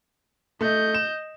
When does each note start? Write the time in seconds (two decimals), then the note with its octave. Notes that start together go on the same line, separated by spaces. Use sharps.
0.61 A3 D#5 G6
0.94 E7